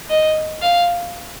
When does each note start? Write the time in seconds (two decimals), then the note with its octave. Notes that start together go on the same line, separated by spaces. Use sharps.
0.10 D#5
0.62 F5